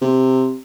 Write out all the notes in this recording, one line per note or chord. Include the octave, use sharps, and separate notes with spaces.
C3